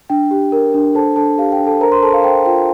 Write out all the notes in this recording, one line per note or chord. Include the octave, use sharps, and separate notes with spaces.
D4 G5
G4
A#4
D4
A4 C5 A5
D4 A4 A5
G4 F5
G5
D4
A4 A5
A#4 C5 A#5
C5 C6
A4 C5 A5
F5
C5 G5
F4 G5